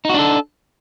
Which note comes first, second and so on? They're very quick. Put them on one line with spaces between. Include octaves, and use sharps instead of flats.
D#4 F#4 D4 A4